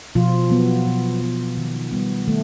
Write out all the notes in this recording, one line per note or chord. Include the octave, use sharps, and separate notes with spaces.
B2 F3 F4
F#3 B3
B2
F#3 B3
D#3
G3 B3
D#3 A3